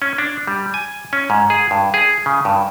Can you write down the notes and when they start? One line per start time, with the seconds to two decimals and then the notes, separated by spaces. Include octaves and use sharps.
0.02 C#4
0.18 D4
0.47 G3
0.74 G#5
1.13 C#4
1.30 G#2
1.50 G#4
1.71 G2
1.94 G#4
2.26 C#3
2.45 G2